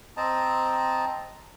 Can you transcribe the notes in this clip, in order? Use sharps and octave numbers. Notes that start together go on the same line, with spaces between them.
C4 D#5 A5 A#5